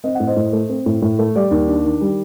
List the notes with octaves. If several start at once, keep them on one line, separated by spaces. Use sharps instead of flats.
C4 D#5
A2 F#5
C5 D#5
A2
A3
C4
A2
A2
A3
G3 D5
D#2
D4
D#3
G3